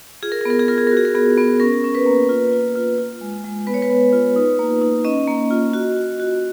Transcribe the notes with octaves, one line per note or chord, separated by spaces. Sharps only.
F4 G#4
A#4
G#4
B3 A#4
G#4
F4 A#4
G#4
A#4
F#4
G#4
A#4
B3 G#4
B3
C#4 A#4
C#4
B4
A#3
F4
F4
F4
F4
G#3
G#3
B3 B4
C#5
B4
B3
F4
D#4
A#3
D#4
C#4 D#5
A#3
F4
F#4
F#4
F#4